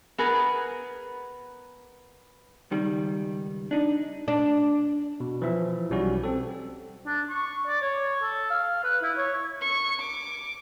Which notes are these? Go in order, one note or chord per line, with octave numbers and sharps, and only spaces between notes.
B3 G#4 A#4
C#2 D#3 G3
D4 D#4
D4
B2
E3 F3 E5
B1 G3 C#4 F#4
C4 A4
D4
C#6
D5
C#5
A4
F5
B4
E4
C#5
C#6
D6